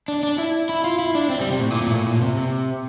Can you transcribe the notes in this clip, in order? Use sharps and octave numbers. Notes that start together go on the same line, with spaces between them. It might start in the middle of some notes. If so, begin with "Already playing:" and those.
D4
D4
E4
E4
F4
E4
D4
C4
G3
C3
A2
A#2
A#2
A2
A#2
C3
C3